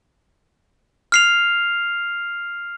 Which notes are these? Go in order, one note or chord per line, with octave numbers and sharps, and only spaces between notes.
F6 C7 F7